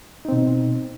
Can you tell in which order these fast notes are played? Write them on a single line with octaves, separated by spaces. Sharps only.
D#4 C4 B2